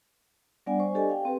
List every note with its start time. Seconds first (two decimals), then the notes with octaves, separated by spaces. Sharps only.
0.66 G3 B3 D4 D5 F#5 G#5
0.80 C5 G#5 C#6
0.95 D4 G4 A4 D5 D#5 G#5
1.09 F5 G5
1.25 C4 G4 B4